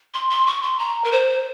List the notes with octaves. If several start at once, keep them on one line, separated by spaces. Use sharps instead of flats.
C6
C6
C#6
C6
A#5
A#4
C5